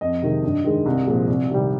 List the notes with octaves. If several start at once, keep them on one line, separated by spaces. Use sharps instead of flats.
F2 D#5
C3 D#3 G#3
G2
D#3 G#3
C2
A#2 F3 G#3
C2
C3 D#3 G3